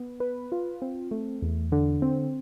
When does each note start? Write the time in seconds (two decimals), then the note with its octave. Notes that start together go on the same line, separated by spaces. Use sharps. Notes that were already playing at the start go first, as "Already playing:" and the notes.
Already playing: B3
0.20 B4
0.52 F4
0.82 C4
1.11 A3
1.42 E2
1.72 D3
2.02 C4